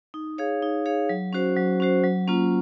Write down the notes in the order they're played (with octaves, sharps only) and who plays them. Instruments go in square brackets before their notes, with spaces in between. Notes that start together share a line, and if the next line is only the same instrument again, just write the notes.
[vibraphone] D#4
G#4 C#5 F5
D#4
G#4 C#5 F5
F#3
C#4 F#4 C5
F#3
C#4 F#4 C5
F#3
A#3 C#4 F4